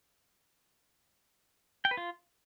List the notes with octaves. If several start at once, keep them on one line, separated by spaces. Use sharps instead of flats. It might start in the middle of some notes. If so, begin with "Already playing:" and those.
G5
B4
F4